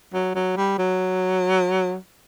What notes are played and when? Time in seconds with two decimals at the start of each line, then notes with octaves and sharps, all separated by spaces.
0.14 F#3
0.35 F#3
0.57 G3
0.78 F#3